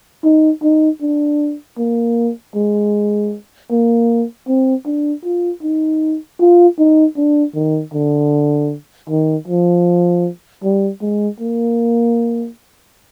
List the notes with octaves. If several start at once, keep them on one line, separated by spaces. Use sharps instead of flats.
D#4
D#4
D4
A#3
G#3
A#3
C4
D4
F4
D#4
F4
D#4
D4
D#3
D3
D#3
F3
G3
G#3
A#3